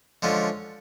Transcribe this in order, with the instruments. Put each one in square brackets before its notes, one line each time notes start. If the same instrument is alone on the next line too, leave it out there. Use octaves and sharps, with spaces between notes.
[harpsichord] D3 F3 G#3 C#4